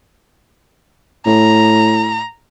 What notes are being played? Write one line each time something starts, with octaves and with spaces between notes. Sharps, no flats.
A2 A#5